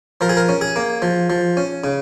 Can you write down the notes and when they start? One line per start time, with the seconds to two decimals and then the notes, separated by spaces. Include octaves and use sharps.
0.21 F3 A#4
0.29 G#4
0.37 A#4
0.49 C#4
0.61 G#4
0.76 A#3
1.02 F3
1.30 F3
1.57 C#4
1.84 C#3